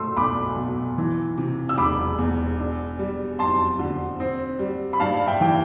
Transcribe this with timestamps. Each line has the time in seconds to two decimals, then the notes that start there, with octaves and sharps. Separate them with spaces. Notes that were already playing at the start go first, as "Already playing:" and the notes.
Already playing: A3 C6 E6
0.16 B1 B5 D6
0.56 B2
0.98 E3
1.38 C3
1.69 E6
1.78 E1 B5 D6
2.18 E2
2.59 D4
2.99 G3
3.39 F2 A5 C6
3.79 D3
4.20 C4
4.59 G3
4.93 B5
5.00 G2 F5 A5
5.26 E5 G5
5.41 E3 G5